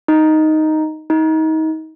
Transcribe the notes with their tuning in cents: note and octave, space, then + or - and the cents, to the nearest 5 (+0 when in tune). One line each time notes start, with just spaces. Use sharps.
D#4 +0
D#4 +30